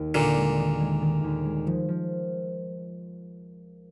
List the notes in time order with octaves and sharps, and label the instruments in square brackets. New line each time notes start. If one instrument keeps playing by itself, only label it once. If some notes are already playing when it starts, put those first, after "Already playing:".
Already playing: [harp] D#2
[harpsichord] A#2 D3 [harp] D#3
[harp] G#3
D#3
G#3
D#3
D#2
G#3
F3
F3